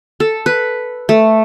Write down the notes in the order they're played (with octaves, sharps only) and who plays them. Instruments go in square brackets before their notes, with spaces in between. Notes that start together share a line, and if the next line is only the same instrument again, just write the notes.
[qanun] A4
B4
A3